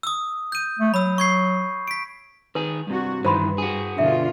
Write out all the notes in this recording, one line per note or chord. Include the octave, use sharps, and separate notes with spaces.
D#6 E6
G6 D#7
A3
F#3 B5 E6
C#6 G#6 C7
B6 D7
D#3 G#4 B4
G2 C3 G3 F#4
G2 D#3 E3 C5 B5 C6
F#4 G#4
B2 D3 F4 E5